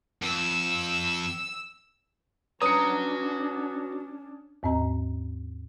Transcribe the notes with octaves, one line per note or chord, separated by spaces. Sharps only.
F2 E6
C#4 D4 F#4 B4 C#5 A#5 D#6 C#7
D#2 G#2 C4 D#5 A#5